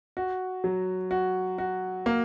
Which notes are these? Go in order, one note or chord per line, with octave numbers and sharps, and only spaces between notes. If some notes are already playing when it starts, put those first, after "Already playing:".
F#4
F#3
F#4
F#4
A#3